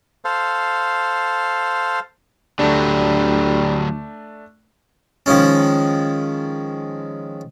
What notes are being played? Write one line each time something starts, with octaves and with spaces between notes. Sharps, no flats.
A4 C5 F5
D2 D3 F#3 G3 A3 D4
D#3 F3 G#3 C#4